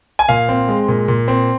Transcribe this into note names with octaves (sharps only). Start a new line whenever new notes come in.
G#5
A#2 F5
C4
G#3
A#2
A#2
C4